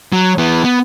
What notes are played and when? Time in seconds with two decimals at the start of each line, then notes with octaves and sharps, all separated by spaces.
0.13 F#3
0.38 E3 B3
0.64 B3